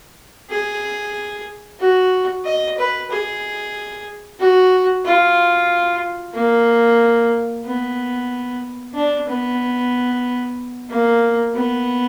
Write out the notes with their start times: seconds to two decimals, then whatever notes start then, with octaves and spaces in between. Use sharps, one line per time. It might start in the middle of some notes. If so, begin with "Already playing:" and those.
0.50 G#4
1.80 F#4
2.45 D#5
2.78 B4
3.10 G#4
4.40 F#4
5.05 F4
6.35 A#3
7.65 B3
8.94 D4
9.27 B3
10.89 A#3
11.54 B3